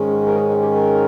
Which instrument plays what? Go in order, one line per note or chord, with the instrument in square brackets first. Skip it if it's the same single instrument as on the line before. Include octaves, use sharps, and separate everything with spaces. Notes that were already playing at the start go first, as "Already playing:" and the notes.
Already playing: [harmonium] G#2 D#3 G#3 C#4
A#4
G#4
D#4
G4
A#4